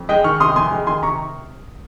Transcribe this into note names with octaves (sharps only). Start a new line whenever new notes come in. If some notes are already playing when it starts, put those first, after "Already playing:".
Already playing: F2
G#3 D#5 G5
D#3 C#6 F6
C3 C6 D#6
F2 G#5 C6
G#3
D#3 G#5 C6
C3 A#5 C#6